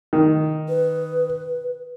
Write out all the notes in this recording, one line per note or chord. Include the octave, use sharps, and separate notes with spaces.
D#3
B4